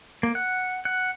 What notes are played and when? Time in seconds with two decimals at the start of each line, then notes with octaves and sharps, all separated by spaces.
0.23 A#3
0.35 F#5
0.85 F#5